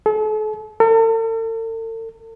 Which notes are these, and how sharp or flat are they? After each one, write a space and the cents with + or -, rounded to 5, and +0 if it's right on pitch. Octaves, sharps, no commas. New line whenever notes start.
A4 -40
A4 +45